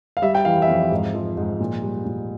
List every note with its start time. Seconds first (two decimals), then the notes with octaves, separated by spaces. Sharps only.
0.17 F5
0.22 G3 E5
0.35 G5
0.45 E3 F5
0.62 E5
0.68 F2 F5
0.91 G#2
1.15 F3
1.37 G#2
1.60 A#2
1.82 G3
2.05 A#2